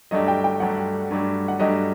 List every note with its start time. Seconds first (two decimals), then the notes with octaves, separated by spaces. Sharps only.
0.11 G2 F#3 A3 D4 G4 D#5
0.28 G5
0.44 G5
0.60 G2 F#3 A3 D4 G4 F#5
1.11 G2 F#3 A3 D4 G4
1.48 F#5
1.59 G2 F#3 A3 D4 G4 D#5